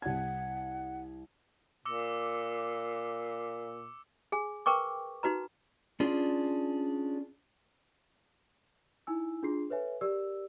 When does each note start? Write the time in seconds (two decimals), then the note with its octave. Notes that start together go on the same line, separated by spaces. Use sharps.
0.02 C2 F#5 G#6
1.85 A#2 D6 E6 C#7
4.32 G#4 G#5
4.66 A#4 B4 G5 C#6 D6
5.23 D#4 F#4 B4 A#5
6.00 C#4 D4 F4 G#4
9.07 D#4 E4 G#5 E6
9.43 D4 F4 G#4 C6 C7
9.70 A4 B4 C#5 E5 G#5
10.01 G4 A#4 D5 E6